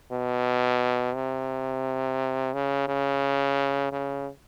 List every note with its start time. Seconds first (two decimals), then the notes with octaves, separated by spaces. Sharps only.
0.12 B2
1.15 C3
2.54 C#3
2.88 C#3
3.92 C#3